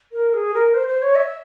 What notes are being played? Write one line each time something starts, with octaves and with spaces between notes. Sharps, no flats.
A#4
G#4
A#4
C5
C5
C#5
E5